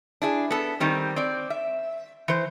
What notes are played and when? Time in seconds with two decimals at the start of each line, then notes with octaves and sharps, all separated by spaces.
0.22 D4 E4 G#4
0.51 B3 A4
0.80 D#3 G3 C4
1.16 C4 D5
1.50 E5
2.28 E3 C5